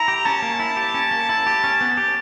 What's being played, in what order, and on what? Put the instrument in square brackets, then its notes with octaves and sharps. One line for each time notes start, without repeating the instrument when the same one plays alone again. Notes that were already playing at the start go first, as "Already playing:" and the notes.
Already playing: [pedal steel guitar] E4 [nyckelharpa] A#5
[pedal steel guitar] G4
[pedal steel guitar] C#4 [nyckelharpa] A5
[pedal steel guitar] A#3
E4
G4
C#4
A#3
E4
G4
C#4
B3
G4